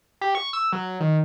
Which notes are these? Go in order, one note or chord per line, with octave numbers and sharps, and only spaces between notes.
G4
C#6
E6
F#3
D#3